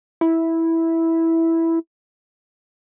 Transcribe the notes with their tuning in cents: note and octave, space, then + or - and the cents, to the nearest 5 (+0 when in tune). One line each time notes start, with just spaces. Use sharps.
E4 -5